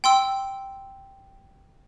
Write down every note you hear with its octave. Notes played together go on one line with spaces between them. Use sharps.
G5 C6 E6